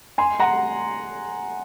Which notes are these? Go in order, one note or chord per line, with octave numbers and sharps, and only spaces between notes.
G#5 C6
F#5 A#5